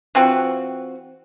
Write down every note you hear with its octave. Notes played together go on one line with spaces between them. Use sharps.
E3 C4 F4 F#4